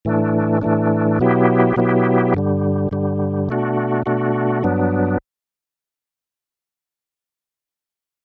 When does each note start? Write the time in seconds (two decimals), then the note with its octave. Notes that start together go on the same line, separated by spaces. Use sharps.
0.05 A2 E3 A3 D4
0.62 A2 E3 A3 D4
1.19 B2 F#3 B3 E4 G4
1.76 B2 F#3 B3 E4 G4
2.34 G2 D3 G3
2.91 G2 D3 G3
3.49 B2 A3 D4 F#4
4.06 B2 A3 D4 F#4
4.63 G2 F#3 B3 D4